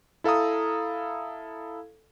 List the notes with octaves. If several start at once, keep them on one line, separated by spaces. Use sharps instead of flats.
E4 A4 F5 A#5 D#6